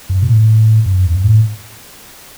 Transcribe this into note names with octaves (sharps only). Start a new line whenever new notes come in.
F#2
B2
A2
F#2
E2
F#2
A2